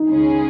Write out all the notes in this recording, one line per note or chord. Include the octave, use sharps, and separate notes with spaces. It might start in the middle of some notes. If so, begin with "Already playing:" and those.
Already playing: D#4
C#2 C#3 G#3 C#4 G#4